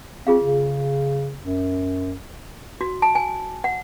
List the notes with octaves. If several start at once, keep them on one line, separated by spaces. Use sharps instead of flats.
C4 F4 G#4 F5
C#3
F#2
F#4
A5
G#5
F#5